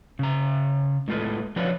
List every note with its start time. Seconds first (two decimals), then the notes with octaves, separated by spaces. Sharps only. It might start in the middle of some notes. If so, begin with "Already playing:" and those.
0.19 C#3 A#5
1.08 A2 G#3 F4 A4 B4
1.56 F3 F#3 D4 F4 B4 C#5